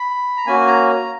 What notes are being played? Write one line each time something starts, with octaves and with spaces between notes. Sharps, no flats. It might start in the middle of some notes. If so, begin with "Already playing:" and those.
Already playing: B5
A#5
A#3 C#4 F#4 G#5
A#5
A#5